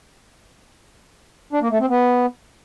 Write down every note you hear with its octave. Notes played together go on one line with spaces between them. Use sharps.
D4
A#3
A3
C4
B3